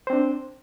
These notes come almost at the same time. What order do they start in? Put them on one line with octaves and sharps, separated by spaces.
C5 C4 D4